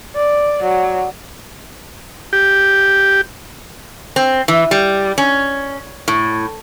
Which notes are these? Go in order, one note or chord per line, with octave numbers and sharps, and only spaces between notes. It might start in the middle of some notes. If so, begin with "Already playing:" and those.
D5
F#3
G4
C4
E3
G3
C#4
A2